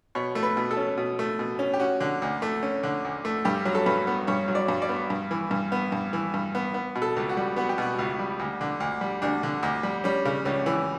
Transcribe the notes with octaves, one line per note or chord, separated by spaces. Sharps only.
B2 C#5
A3
B4
B2
A4
C#4
B2
A3
B2
C#4
G4
C#4 F#4
D3
D2
A3
C#4
D3
D2
A3
G2 G4
F#3
A4
G2 B4
B3
G2 C#5
F#3
D5
G2
D5
B3
G2
E3
G2
B3
G2
E3
G2
B3
B3
B2
A4
C#2
F#4
G3
B3 F#4
G4
B2 F#4
C#2
G3
D2
D3
D2
G3
D2 D4
D3
D2
G3
G3 C#4
C#3
C#2 C#4
E3